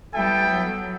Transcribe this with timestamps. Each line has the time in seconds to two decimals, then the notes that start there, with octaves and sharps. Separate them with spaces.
0.14 G3 B3 E4 A4 E5 G5
0.50 F#3